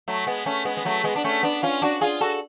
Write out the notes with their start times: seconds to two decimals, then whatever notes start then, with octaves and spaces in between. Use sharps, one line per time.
0.08 F#3 A3
0.26 G#3 B3
0.46 A3 C#4
0.65 G#3 B3
0.77 B3
0.85 F#3 A3
1.04 G#3 B3
1.16 D4
1.24 A3 C#4
1.43 B3 D4
1.63 C#4 F4
1.82 D4 F#4
2.01 F4 G#4
2.21 F#4 A4